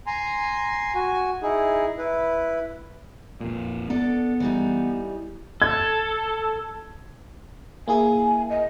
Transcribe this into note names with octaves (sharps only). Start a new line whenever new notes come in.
G#5 A#5 C6
F#4 G#5
D#4 E4 G#4
E4 B4
F2 A#2
B3 D4 A4
E3 G3 D#4
A4 G#6
A#3 E4 G#4 G#5
D#5